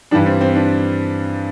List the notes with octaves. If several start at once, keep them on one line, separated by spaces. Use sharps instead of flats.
G2 E3 G3 D4
C4
C4
D4